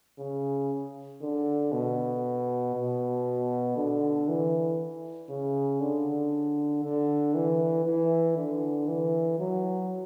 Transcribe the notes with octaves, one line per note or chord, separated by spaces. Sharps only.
C#3
D3
B2
B2
D3
E3
C#3
D3
D3
E3
E3
D3
E3
F#3